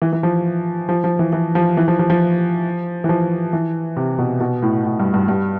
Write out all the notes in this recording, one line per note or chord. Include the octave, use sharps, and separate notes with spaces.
E3
E3
F3
F3
F3
E3
E3
F3
E3
F3
F3
F3
E3
F3
E3
C3
B2
B2
A2
A2
G2
G2
G2